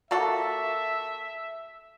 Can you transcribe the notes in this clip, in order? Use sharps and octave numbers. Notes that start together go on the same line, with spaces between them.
A#3 F#4 A4 E5